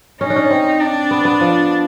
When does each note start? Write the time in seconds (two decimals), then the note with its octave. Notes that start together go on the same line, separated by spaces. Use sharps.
0.21 C#4 D#4
0.30 D4
0.36 C#4
0.51 C4
0.80 D4
1.11 B3
1.25 B3
1.41 F3